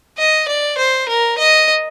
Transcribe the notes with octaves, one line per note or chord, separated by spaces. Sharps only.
D#5
D5
C5
A#4
D#5